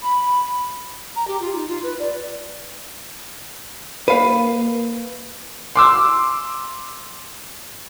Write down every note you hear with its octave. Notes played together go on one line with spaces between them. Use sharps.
B5
A#5
G4
F4
D#4
F4
B4
D5
A#3 B4 F5
C6 D6 E6